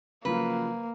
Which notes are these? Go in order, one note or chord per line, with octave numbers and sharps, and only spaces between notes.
C#3 F3 F#3 A#3 B4